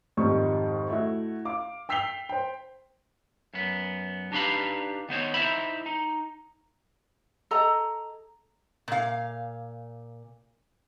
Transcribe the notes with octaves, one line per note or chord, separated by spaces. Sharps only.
F2 G#2 D#3 G3 C#6
A3 E4 F#4
F5 D6
G5 E6 B6 C7 F7 G7
C5 G5
F#2 B3
D4 D#4 G4 B4 F5 B5
D#3 B3 C5 C#5
D#4 E4 A#4 C5 E5 B5
D#4
A4 D#5 A#5
A#2 F5